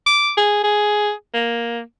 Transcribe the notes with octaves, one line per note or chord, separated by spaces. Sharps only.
D6
G#4
G#4
A#3